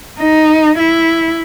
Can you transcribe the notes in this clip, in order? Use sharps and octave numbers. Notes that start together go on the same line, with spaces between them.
D#4
E4